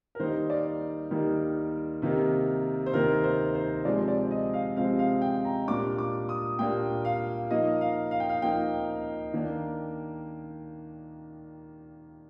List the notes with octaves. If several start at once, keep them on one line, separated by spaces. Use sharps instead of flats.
A#4
D#3 G3 A#3 D#4 C5
D5
D#3 G3 A#3 D#4
C3 D#3 A#3 D#4
C5
C3 D#3 A#3 D#4 A#4
C5
C5
C3 F3 G#3 C4 D5
D5
D#5
F5
C3 F3 G#3 C4 F5
F5
G5
A#5
A#2 G3 A#3 D4 D6
D6
D#6
A#2 G3 A#3 D4 G5
F5
F3 A#3 D#4 D#5
F5
F5
G5
F5
F3 A#3 D#4 G5
D#3 A#3 D4